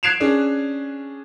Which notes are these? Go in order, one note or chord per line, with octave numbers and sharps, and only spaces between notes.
F#6 G#6 C7 D7 E7 F7
C#4 D4 G#4